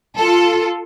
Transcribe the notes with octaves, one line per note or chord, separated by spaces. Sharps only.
F4 A4